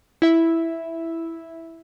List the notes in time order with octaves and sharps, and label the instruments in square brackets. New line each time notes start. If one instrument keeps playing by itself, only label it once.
[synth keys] E4 E5